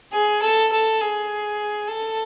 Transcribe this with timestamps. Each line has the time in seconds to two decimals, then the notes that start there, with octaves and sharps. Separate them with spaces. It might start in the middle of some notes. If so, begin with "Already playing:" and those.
0.13 G#4
0.42 A4
0.72 A4
1.01 G#4
1.88 A4